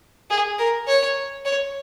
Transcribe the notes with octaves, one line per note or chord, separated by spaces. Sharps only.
G#4
A#4
C#5
C#5